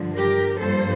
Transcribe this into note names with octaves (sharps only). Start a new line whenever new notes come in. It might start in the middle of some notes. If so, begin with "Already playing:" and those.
Already playing: G2 D3 F3
G4 A#4
G2 F3 A#3 A4 C5